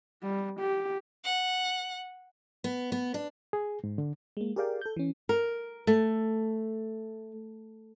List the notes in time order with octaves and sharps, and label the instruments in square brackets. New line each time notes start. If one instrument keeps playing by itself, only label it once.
[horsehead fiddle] G3
G4
[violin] F#5
[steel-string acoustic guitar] B3
B3
D4
[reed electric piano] G#4
G#2
D3
[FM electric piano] G#3 A#3
G4 G#4 A#4 D5 F5 G5
A4 G6
E3 C#4
[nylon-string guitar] A#4
A3